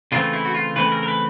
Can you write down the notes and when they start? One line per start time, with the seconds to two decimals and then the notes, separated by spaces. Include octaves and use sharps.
0.12 C#3 E3 A3 C4 F4
0.33 E4
0.45 F#4
0.54 F4
0.76 C#3 E3 A3 C4 B4
0.92 A#4
1.03 A#4
1.08 B4